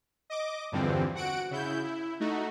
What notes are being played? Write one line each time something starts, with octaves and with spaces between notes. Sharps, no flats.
D#5 D6
E2 G2 D3 E3 F3 C4
F#4 F#5 D7
C#3 E4 G6
E4
A3 D#4 F#4